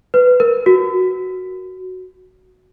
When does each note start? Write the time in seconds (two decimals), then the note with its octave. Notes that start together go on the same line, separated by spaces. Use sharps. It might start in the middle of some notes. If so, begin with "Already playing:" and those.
0.14 B4
0.40 A#4
0.66 F#4